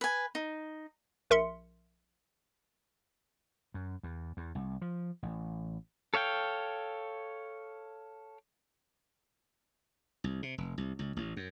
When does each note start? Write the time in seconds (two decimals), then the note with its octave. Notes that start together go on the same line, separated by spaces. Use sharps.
0.01 B4 G#5
0.35 D#4
1.31 A#1 A#4 E5 C6 C#7
3.74 F#2
4.03 E2
4.37 E2
4.55 C2
4.82 F3
5.23 A1
6.14 A4 C#5 F5 G5
10.24 C2
10.43 C3
10.58 F1
10.78 C2
10.99 C#2
11.16 A1
11.37 F#2